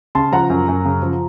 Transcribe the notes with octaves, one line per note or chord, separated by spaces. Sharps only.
C#3 A5 C6
F3 F#5 A#5
F#2
F#2
C#3
F3